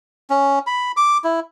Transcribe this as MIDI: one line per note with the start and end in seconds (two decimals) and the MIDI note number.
0.30 0.59 61
0.67 0.92 83
0.97 1.18 86
1.24 1.40 64